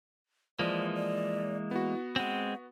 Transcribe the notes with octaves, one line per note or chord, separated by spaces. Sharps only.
E3 F3 G#3 A#3 D5
D5
B3 E4 F#4
G#3 C4 F#5